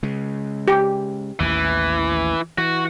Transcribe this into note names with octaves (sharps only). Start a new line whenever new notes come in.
C#3 G#3
G4
A1 D#2 E3
E3 F#4